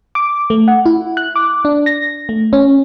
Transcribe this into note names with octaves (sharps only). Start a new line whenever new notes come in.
D6
A3
F#5
E4
F#6
D6
D4
A#6
A3
C#4